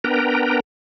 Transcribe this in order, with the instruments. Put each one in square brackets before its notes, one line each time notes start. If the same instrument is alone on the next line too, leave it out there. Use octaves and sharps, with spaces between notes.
[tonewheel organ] B3 D4 A#4 B4 G5 A#5